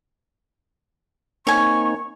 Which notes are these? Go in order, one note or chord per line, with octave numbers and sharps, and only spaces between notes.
A#3 C4 D#4 C#5 G#5 C#6